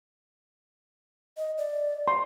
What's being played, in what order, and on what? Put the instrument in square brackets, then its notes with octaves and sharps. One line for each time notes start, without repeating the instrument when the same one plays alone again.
[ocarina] D#5
D5
[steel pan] C6